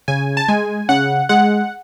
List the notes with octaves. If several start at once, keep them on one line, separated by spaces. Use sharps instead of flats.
C#3 G#5
A5
G#3 G#5
C#3 F#5
G#3 F#5